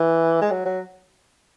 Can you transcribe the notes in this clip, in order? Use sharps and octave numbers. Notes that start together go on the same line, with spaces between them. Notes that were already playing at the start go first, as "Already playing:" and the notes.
Already playing: E3
G#3
F#3
F#3